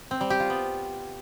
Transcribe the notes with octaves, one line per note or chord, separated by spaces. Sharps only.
C4
G3
G4
F4
B3